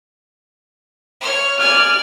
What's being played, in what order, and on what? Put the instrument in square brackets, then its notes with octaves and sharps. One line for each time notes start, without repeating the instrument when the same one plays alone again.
[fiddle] C#5 F6
[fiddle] D5 G#5 [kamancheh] F6